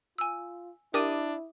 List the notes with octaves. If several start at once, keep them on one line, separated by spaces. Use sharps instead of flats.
F4 G#5 E6
D4 E4 G4 A#4 D6 D#6 D#7